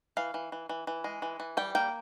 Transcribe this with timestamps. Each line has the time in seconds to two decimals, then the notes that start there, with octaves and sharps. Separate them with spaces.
0.17 E3 F5
0.34 E3
0.52 E3
0.69 E3
0.87 E3
1.04 G#3
1.22 E3
1.40 E3
1.57 G3 G5
1.75 A#3 G5